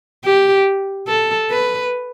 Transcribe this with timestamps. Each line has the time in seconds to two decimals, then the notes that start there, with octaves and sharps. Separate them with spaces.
0.25 G4
1.08 A4
1.50 B4